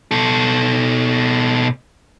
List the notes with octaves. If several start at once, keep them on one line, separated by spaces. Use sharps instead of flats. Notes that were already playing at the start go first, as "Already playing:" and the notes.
B2 A4